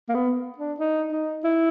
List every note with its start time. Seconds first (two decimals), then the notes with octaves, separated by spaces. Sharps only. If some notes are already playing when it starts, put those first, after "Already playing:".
0.09 A#3
0.15 B3
0.58 D4
0.80 D#4
1.12 D#4
1.44 E4